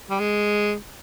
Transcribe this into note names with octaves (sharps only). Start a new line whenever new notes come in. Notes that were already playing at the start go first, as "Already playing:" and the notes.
G3
G#3